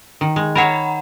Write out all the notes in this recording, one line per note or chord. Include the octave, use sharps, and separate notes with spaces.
D#3
G#3
A#4 C#5 F#5 A#5 B5